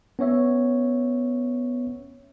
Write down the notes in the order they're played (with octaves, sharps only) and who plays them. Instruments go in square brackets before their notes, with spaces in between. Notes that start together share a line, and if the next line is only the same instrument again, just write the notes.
[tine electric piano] B3 C#4 C#5 E5